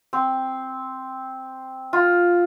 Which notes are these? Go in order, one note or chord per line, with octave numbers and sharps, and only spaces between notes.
C4
F4